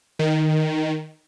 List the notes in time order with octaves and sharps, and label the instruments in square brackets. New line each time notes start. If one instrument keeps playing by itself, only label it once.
[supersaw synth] D#3